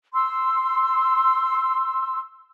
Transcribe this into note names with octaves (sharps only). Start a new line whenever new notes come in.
C6 E6